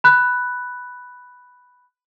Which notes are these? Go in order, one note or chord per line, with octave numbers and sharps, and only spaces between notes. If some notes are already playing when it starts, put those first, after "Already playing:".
B5 F#6